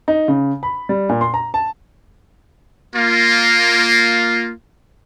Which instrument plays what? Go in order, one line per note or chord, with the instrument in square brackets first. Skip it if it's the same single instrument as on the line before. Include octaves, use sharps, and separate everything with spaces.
[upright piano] D#4
C#3
B5
G3
A#2
C6
A#5
A5
[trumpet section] A#3 F4